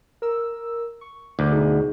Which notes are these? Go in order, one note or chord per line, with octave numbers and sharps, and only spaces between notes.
A#4 E6
C#6
D2 D6
B2 D#4 G#4